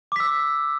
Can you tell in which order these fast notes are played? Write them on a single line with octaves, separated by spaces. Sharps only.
D6 B6 E6